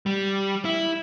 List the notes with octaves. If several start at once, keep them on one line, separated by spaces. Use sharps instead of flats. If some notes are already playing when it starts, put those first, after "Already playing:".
G3
E4